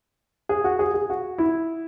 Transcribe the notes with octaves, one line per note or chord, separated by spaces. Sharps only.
G#4
F#4
G#4
G#4
F#4
E4